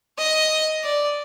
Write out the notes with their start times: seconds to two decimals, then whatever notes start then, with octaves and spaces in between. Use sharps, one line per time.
0.18 D#5
0.84 D5